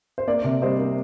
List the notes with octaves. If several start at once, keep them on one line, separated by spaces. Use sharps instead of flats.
C5
A#3 D5
C3
G3 C5 D#5
A#3